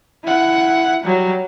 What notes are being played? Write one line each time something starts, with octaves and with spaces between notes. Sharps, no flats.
E4 F#5
F#3 G3